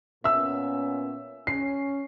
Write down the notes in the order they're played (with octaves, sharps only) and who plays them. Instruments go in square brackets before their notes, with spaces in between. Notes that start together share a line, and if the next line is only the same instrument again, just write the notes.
[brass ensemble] A#2 B3 C#4 [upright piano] E5 E6
[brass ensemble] C#4 [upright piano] C7